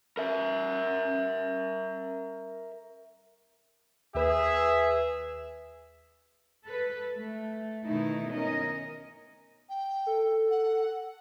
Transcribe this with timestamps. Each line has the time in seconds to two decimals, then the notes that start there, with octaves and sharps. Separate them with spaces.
0.17 A#4 E5
4.15 D#2 G#4 B4 E5 E7
6.65 A4 B4
7.14 A3
7.84 B2 D#3 A3 D#4 E4
8.33 C#4 A#4 D#5
9.69 G5
10.06 A4
10.50 F#5